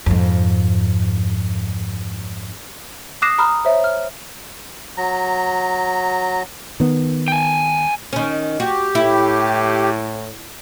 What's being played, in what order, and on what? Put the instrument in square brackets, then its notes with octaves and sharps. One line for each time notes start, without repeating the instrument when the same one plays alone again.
[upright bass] F2 G#2
[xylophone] D6 D#6 F#6 A#6 C7 E7
A#5 B5 D#6 F6 F#6
C5 C#5 E5
F6
[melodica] F#3 A#5
[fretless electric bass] D#3 B3
[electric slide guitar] G5 G#5
[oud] D#3 C#4
[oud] F#4 [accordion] G4
[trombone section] A2 [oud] E4